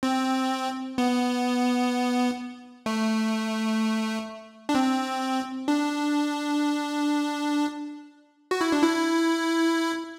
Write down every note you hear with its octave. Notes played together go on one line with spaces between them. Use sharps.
C4
B3
A3
D4
C4
D4
F#4
E4
D4
E4